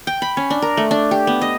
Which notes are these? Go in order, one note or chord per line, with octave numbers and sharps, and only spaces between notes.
G5
B5
C#4
D4
A#4
A3
D4
G4
B3
D#5